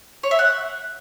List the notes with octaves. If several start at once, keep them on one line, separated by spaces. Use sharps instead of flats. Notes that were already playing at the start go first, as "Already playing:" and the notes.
C#5
E5
F#5